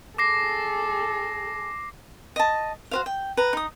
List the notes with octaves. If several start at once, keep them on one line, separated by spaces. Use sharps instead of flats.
G#4 A4 D6 A#6 C7
D#5 A5
F#4 C5 F5
G5
B4 A#5
D#4 D#6